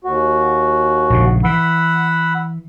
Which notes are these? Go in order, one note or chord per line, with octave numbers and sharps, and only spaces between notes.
D#2 F#4
A#1 G#2 C#3
E3 F#5 B5 E6